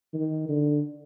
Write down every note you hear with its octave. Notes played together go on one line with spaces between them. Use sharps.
D#3
D3